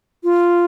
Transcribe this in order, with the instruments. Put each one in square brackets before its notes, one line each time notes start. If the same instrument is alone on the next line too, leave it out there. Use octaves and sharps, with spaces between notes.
[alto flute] F4